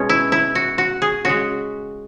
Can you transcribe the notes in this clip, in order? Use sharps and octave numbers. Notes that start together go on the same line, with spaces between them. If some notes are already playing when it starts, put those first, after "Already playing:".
Already playing: B2 G#3 C#4
E4
E4
F#4
F#4
G#4
C#3 G#3 F#4